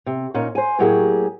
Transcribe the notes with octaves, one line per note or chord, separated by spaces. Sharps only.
C3
A#2 C#4 D#4
C5 G#5
A2 F#3 A#3 G4 G#4